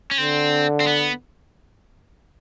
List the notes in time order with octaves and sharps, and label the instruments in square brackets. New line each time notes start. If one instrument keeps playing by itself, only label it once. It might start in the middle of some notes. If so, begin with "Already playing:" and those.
[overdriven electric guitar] C#4
[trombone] D3 [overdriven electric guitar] C4
[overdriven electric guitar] C4
B3